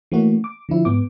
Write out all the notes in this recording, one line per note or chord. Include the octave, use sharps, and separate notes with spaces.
E3 A3 A#3 C#4 F#4
D6
D3 F3 E4
G#2 B3 D6